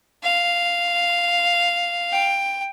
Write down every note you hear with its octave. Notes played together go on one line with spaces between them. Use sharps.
F5
G5